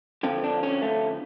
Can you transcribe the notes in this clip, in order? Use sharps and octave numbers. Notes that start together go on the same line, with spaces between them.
F2 D3 F3 C4
D4
C#4
A3